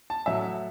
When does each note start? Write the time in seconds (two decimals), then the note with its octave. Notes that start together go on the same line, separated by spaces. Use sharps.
0.10 A5
0.26 A2 F#3 E5